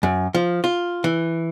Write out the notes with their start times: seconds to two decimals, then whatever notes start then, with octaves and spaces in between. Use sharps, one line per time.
0.03 F#2
0.34 F3
0.64 F4
1.04 E3